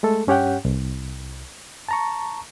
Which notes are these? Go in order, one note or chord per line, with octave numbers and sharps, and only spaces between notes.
G#3 A3 A4
G2 C#4 G4 C#5 F#5 G5
C2
A5 A#5 C#6